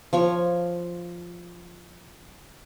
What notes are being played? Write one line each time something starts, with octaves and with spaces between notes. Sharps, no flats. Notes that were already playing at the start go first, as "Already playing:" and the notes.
F3 C#5 C#6